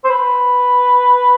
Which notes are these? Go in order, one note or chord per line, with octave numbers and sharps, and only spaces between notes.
C5
B4